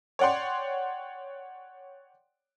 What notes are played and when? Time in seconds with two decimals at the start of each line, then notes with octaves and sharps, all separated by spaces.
0.19 C#5 D5 F#5 G5 C6